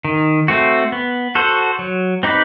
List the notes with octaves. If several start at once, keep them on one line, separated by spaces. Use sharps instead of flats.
D#3
A3 C4 F#4
B3
F#4 A4 C5
F#3
C4 D#4 G4 B4